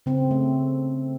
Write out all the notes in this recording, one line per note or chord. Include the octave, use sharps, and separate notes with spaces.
C#3 C4
A3